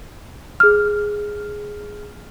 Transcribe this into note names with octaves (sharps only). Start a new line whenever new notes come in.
G#4 F6